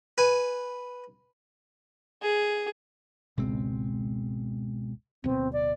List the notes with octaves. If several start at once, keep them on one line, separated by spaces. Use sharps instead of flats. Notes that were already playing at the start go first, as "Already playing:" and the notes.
B4 G#5
G#4
G#1 C#2 B2 G#3 C4
D1 B2 C4
D5